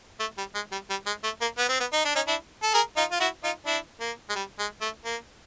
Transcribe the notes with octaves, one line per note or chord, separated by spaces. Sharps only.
A3
G3
G#3
G3
G3
G#3
A3
A#3
B3
C4
B3
D#4
D4
C#4 D#4
D4 E4
A4
G#4 A#4
D#4 F4
F4
E4 F#4
D#4 F4
D4 E4
A#3
G#3
G3
G#3
A3
A#3